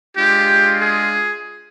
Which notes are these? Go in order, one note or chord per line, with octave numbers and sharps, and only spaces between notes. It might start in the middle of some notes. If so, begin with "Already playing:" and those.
G#3 D4 F4 G4
G#4